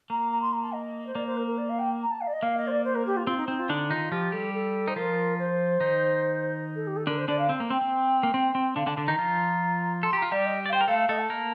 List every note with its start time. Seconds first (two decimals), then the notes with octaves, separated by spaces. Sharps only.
0.10 A#3 A#5
0.32 A#5
0.41 C6
0.53 A#5
0.62 A5
0.73 D#5
1.06 C5
1.15 A#3 D5
1.26 C5
1.37 A#4
1.47 A#4
1.57 D5
1.69 F5
1.79 G5
2.02 A#5
2.11 A5
2.21 F5
2.27 D5
2.32 D#5
2.42 A#3 F5
2.57 D#5
2.67 C5
2.70 D5
2.84 C5
2.95 A#4
3.06 G4
3.16 F4
3.27 C4 F4
3.37 D#4
3.48 C4 D#4
3.59 F4
3.69 D3 D4 D#4
3.90 D#3 D#4 F4
4.11 F3 F4 G4
4.32 G3 G4 A4
4.54 A4
4.88 D#4 C5
4.96 F3 F4 A#4
5.38 C5
5.80 D#3 D#4
6.75 A4
6.87 G4
6.96 A4
7.07 D3 D4 A#4
7.18 C5
7.28 D3 D4 D5
7.38 F5
7.49 C4
7.60 A#3
7.70 C4 G5
7.81 C4
8.23 A#3
8.34 C4
8.55 C4
8.76 D3 D4 F5
8.86 D3 D4 A5
8.97 D3 D4 A5
9.07 D#3 D#4 A#5
9.18 F3 F4
10.03 A4 C6
10.13 G4 A#5
10.22 F4
10.31 G3 G4 D5
10.45 D#5
10.66 D5
10.69 F5
10.73 C5 G5
10.81 A#4
10.88 A3 A4 F5
10.98 F5
11.09 A3 A4 D#5
11.19 A5
11.30 A#3 A#4